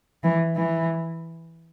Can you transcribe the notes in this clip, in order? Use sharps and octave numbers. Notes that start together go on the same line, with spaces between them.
E3
E3